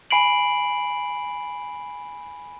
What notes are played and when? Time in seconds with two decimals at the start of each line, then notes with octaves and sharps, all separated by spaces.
0.11 G#5 B5 C7 D7 F#7